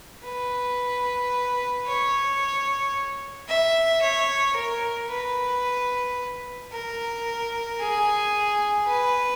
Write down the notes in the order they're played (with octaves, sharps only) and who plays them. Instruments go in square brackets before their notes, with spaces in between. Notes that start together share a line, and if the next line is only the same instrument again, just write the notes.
[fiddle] B4
C#5
E5
C#5
A#4
B4
A#4
G#4
B4